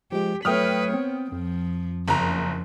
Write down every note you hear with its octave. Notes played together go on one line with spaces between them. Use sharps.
F3 G#3 G4
F#3 A3 B4 C#5 G5 D#6 F6
B3 C4
F2 F3
F#1 F3 A#5